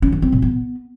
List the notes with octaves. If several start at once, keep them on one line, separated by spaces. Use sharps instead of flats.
C#4
D#3
C4
A#2
B3